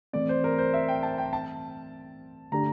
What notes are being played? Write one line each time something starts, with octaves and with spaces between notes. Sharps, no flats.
E3 A3 C4 D5
C5
A#4
C5
E5
G5
A5
G5
A5
D3 A3 D4 G4 A#5